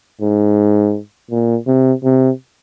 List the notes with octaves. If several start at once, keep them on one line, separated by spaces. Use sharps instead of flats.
G#2
A#2
C3
C3